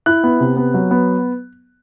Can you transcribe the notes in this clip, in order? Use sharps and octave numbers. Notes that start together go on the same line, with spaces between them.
E4 F#6
B3
C3
B3
F#3
B3